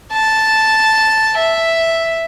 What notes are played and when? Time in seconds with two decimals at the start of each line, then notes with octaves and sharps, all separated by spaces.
0.13 A5
1.38 E5